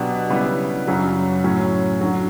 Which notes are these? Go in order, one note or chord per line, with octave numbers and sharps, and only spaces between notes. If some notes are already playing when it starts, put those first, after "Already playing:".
Already playing: B2 F#3 B3 D4 G4
C#3 G3 B3 E4
F#2 C#3 F#3
A2 F#3 C#4
D3 F#3